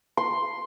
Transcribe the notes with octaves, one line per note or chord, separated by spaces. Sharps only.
C6